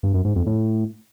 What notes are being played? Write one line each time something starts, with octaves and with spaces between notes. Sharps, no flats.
G2
F#2
G#2
F2
A2